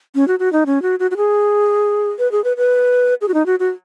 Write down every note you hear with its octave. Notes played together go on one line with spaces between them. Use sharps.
C#4
F#4
F#4
D#4
C#4
F#4
F#4
F#4
G#4
B4
G#4
B4
B4
G#4
F#4
D#4
F#4
F#4